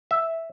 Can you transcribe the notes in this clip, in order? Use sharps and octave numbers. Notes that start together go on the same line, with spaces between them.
E5